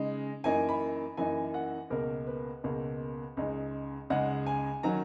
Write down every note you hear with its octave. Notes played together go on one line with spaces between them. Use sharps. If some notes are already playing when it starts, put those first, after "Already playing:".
Already playing: C#3 G#3 D#4
F#2 E3 A#3 D#4 G#5
B5
F#2 E3 A#3 D#4 G#5
F#5
C#2 B2 A#3 A#4
B4
C#2 B2 A#3
C#2 C#3 G#3 D#4
C#2 C#3 G#3 D#4 F#5
G#5
D#3 F#3 C#4 A#5